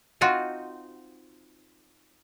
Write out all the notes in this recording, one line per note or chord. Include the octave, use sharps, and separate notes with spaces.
C4 D#4 F4 F#4